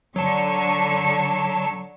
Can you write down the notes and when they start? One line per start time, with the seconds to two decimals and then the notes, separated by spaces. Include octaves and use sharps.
0.16 D3 F#3 A5 C#6